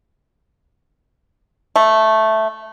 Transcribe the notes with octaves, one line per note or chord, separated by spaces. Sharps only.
A3